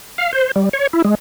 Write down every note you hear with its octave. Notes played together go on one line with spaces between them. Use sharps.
F5
C5
G3
C#5
E4
G#3